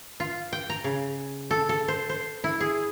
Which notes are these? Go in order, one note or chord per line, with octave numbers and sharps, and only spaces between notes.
F4
G5
A#5
C#3
A4
A4
C5
C5
E4
G#4